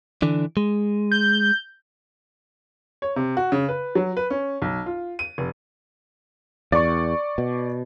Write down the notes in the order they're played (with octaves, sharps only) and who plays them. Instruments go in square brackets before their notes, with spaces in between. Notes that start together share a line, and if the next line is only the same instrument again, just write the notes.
[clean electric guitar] D3 E3 D4
G#3
[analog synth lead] G6
[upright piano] C#5
C3
F#4
C#3
B4
F#3
B4
C#4
B1
F4
D#7
F1
[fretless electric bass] E2 [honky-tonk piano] D5 C#6
[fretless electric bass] B2